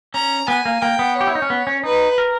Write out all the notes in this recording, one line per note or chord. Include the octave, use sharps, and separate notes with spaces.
C#4 A#5
B3 G#5
A#3
A#3 G5
B3
G4 C#5
E4
D#4
C#4
B3
C#4
D#4 B4
A#4